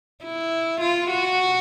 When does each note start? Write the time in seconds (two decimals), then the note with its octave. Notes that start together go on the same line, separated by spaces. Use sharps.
0.25 E4
0.81 F4
1.10 F#4